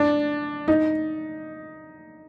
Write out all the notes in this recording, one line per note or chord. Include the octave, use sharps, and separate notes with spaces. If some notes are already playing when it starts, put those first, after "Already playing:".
Already playing: D4
D#4